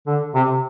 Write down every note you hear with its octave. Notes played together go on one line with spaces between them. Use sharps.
D3
C3